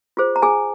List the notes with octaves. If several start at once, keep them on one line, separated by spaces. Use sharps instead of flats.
F4 G#4 C5
A#5
G#4 G#5